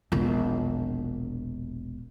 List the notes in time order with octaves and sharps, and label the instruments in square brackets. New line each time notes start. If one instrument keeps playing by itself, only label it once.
[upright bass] E1 A#1